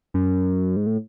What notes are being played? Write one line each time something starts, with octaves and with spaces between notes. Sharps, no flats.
F#2
G#2
A2